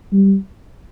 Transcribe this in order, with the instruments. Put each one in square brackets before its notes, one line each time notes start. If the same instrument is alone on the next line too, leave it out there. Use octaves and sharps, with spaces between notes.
[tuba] G3